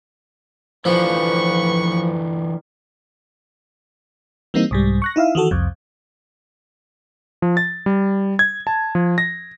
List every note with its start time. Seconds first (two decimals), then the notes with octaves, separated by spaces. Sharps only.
0.85 D3 E3 F3 B4 C#6
4.54 E3 G3 A#3 C4 D#4
4.71 C2 G#2 G3
5.02 C#6 F#6 A#6
5.16 D#4 E4 E5 F5
5.35 D#3 E3 F#4 A4
5.51 C2 F2
7.42 F3
7.57 A6
7.86 G3
8.39 G#6
8.67 A5
8.95 F3
9.18 A#6